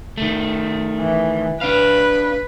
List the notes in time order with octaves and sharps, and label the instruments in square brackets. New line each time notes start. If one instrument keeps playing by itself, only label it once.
[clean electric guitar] D#3 A3
[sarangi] E3
[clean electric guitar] D4 F5 [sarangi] B4